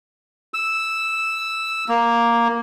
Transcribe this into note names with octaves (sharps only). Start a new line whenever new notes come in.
E6
A#3